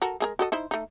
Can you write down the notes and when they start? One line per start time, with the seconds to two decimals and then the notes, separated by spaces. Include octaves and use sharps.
0.02 F#4 A4 A#4
0.20 G#3 G#4 A#4
0.39 F#4 A4 D#5
0.52 D#4 E4 C5
0.71 A3 D#4